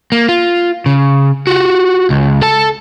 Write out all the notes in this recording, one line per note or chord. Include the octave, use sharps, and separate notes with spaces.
A#3
F4
C#3
F4 F#4
C#2
A4 A5